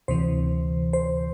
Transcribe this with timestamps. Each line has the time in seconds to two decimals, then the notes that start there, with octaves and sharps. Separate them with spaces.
0.08 D2 C3 E3 C5
0.93 C5